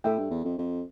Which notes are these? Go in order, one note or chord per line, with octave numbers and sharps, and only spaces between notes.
A2 A4 E5 G5
G2
E2
F2
F2